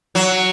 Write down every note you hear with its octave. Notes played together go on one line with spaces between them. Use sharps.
F#3